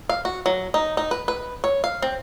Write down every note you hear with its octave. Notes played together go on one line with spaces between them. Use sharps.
F5
F#4
F#3
D#4
D#4
B4
B4
C#5
F5
C4